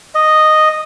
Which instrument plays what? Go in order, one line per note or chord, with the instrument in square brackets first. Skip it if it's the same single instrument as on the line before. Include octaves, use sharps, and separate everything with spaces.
[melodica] D#5